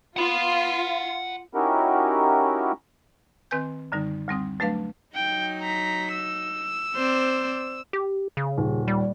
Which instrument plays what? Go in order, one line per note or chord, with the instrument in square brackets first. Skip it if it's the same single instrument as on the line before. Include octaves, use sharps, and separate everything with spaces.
[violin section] F4 [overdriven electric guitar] F#5 B5
[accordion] C#4 D#4 E4 F#4 G4 A#4
[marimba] D#3 C4 B4 G#5 G6
F#2 D3 G3 D#4
D2 G3 C4 D#6
F#3 A3 D4 B4 F5
[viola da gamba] F#3 D#4 [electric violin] G5
[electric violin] A#5 B6
E6
[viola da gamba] C4 C5 D5
[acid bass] G4
C#3
[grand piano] D#1
[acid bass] G3